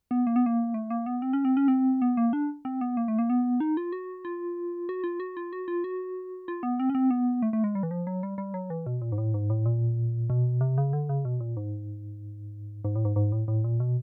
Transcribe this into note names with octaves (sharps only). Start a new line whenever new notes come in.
B3
A#3
B3
A#3
A3
A#3
B3
C4
C#4
C4
C#4
C4
B3
A#3
D4
C4
B3
A#3
A3
A#3
B3
D#4
F4
F#4
F4
F#4
F4
F#4
F4
F#4
F4
F#4
F4
B3
C4
C#4
C4
B3
A3
A3
G#3
G3
E3
F3
F#3
G3
G3
F#3
E3
B2
A#2
G#2
A2
G#2
A2
A#2
B2
C3
C#3
D3
C#3
B2
A#2
G#2
G#2
A2
G#2
G#2
A2
A2
A#2
B2